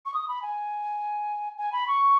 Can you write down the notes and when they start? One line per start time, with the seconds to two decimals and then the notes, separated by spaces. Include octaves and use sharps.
0.06 C#6
0.14 D#6
0.28 B5
0.42 G#5
1.58 G#5
1.72 B5
1.87 C#6